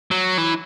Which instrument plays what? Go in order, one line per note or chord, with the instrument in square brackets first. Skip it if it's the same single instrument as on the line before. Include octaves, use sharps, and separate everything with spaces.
[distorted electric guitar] F#3
E3